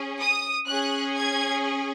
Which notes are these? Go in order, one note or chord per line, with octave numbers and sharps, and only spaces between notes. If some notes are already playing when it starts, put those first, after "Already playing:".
Already playing: C#4 G#4
D#6
C#4 G#4 F#6
G#6